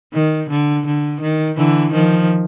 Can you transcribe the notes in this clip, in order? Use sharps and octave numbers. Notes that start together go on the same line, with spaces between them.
D#3
D3
D3
D#3
D3 E3
D#3 F3